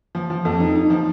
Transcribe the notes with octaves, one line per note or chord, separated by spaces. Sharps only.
F3
F3
F2
D#4
D#4
F3